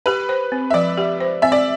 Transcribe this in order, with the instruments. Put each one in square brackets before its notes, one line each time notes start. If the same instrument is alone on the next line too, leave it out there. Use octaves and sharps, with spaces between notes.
[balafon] G4 [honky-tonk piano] B4
[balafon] C5
C4
[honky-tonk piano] E5
[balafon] F3 [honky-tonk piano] D5
[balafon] G4
C5
[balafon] C4 [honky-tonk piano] E5
[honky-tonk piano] D5